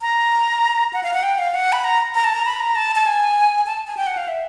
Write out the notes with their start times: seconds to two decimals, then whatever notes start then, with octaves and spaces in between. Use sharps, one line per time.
0.02 A#5
0.93 F#5
1.03 F5
1.13 F#5
1.23 G5
1.39 F5
1.54 F#5
1.72 B5
1.84 A#5
2.15 A#5
2.24 A5
2.34 A#5
2.46 B5
2.60 A#5
2.75 A5
2.96 A5
3.06 G#5
3.66 A5
3.87 G#5
3.97 G5
4.07 F#5
4.17 F5
4.28 E5